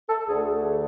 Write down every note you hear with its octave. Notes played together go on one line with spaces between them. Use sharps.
A4
D2 D3 A3 G#4